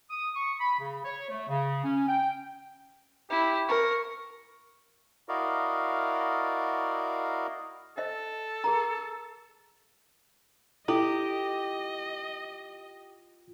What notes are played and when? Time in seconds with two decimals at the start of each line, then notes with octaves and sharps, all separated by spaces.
0.11 D#6
0.36 C#6
0.59 B5
0.80 C#3
1.05 C#5
1.30 A3
1.49 C#3
1.84 C#4
2.08 G5
3.30 E4 G4
3.69 A#4 C#6
5.29 E4 F#4 A#4 D5 D#5 F5
7.97 A4 C5 D#5 E5
8.64 G#4 A#4 A#5
10.88 E4 F4 G4 A4 D#5